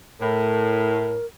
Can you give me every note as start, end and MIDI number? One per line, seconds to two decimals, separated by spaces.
0.21 1.19 45
0.21 1.26 70